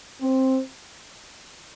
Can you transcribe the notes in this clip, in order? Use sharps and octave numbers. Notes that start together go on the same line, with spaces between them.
C4